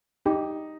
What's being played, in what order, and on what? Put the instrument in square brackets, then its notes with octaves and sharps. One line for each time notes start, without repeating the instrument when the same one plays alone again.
[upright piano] D#4 [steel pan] G4